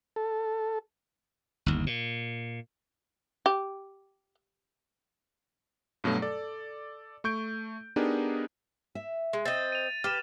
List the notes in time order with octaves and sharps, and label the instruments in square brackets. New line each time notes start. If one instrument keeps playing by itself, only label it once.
[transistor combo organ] A4
[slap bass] G1 D#2
A#2
[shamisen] G4
[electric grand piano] G2 B2 F#3 A3
A4 D5
A3 C#6 G6 D7
B3 D4 D#4 G4 G#4 A#4
[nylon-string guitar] E5
[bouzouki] G#3
[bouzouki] C4 D#5 [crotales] A6
[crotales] D#7 F7
[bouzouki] G4 [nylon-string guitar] B4 [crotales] F6 E7